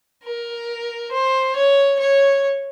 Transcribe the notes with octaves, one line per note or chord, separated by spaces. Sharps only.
A#4
C5
C#5
C#5